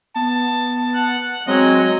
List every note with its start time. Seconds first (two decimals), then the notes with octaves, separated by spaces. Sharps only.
0.16 B3 A5
0.94 F#5
1.47 F#3 G#3 C4 F#4 C#5 D#5